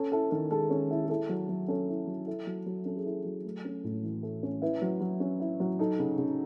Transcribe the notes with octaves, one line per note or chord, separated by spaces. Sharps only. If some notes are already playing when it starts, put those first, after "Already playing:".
Already playing: C#4 A4
E4 A4
D#3 A4
G#3 A4
C#4
E4
G#4
E4 A4
F#3
F#3
C#4 A4
E4
F#3
E4 A4
F#3
F#3
C#4 A4
G#4
E4 A4
F#3
A3
C#4
A2
E3
A3
C#4
E4 B4
F#3
F#3
C#4
E4
F#3
D#4 A4
C#3
C#3